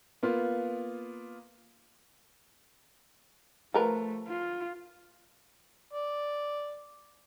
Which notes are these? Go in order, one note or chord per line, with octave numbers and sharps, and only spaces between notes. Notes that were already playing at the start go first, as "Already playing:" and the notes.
A#3 B3 F4
F3 A3 A#4 B4
F4
D5